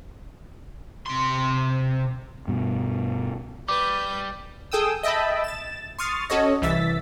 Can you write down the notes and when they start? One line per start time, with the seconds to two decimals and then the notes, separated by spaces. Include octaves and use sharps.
1.06 C3 C6
2.48 G2 B2
3.68 G3 B4 D6 G6
4.72 G#4 A4 G5 D#6 E6
5.03 D#5 E5 G5 A5 B5
5.44 A6 E7
5.99 C6 C#6 D#6 F6 A6
6.30 C#4 F#4 A4 C#5 D#5
6.62 C2 E3 E5 A6 B6